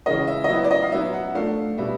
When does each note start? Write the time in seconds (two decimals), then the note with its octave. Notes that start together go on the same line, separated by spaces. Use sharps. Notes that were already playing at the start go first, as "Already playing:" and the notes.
0.06 C#3 E3 G#3 C#4 D#5
0.27 E5
0.44 D#5
0.49 F#3 B3 E4 E5
0.64 D5
0.71 D#5
0.82 F5
0.92 F#3 B3 D#4 E5
1.13 F#5
1.35 F3 A3 D4 F5
1.78 B2 G3 B3 E5